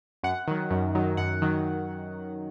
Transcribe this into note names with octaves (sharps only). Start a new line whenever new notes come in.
F#2 F#5
D#3 F#3
F#2
D#3 F#3
F#2 F#5
D#3 F#3